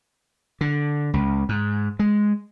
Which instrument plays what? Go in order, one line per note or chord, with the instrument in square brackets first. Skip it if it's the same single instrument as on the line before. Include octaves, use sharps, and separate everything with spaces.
[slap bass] D3
C#2
G#2
G#3